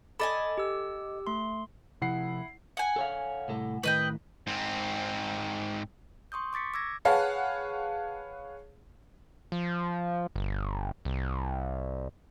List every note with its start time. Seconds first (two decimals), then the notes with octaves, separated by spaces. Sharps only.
0.20 A4 D#5 G#5 B5 D6 A6
0.58 G4 E6
1.27 A3 C6
2.02 C3 F3 E4 F#5 C7
2.77 F#5 G#5
2.96 A4 C#5 F5
3.48 C2 A2 A4
3.83 A2 D#3 B4 D#5 G5
4.47 G#2 C4
6.32 C6 C#6 D#6 G6
6.53 C#6 D6 A6 B6 C#7
6.74 D6 E6 G#6 A#6
7.05 G#4 B4 C#5 F5 F#5 A5
9.52 F3
10.36 G1
11.05 C2